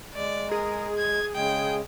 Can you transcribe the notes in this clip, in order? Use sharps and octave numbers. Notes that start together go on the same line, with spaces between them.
G#3 D5
G#4 A#4
G#6
C#3 G#3 G5